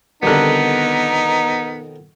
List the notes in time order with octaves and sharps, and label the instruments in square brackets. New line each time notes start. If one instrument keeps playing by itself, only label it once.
[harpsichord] F2 B2 D#3 [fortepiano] D3 G3 [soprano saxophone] B3 [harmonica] D#4 A#4